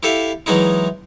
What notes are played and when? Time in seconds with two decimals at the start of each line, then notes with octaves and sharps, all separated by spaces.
0.03 E4 G4 A4 E5 F5
0.46 E3 F#3 G#3 D#4 E4